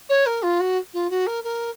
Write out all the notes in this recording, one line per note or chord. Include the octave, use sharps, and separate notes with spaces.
C#5
A#4
F4
F#4
F4
F#4
A#4
A#4